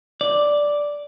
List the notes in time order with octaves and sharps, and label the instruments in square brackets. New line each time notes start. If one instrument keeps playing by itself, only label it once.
[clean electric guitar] D5